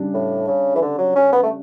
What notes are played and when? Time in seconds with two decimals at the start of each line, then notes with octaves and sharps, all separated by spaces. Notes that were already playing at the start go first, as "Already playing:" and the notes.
Already playing: C#3 G3 D4
0.14 A2
0.47 C#3
0.75 E3
0.82 D3
0.98 F#3
1.16 C#4
1.33 B3
1.43 A3